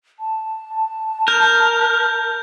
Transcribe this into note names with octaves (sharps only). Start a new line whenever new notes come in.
A5
A#4 G6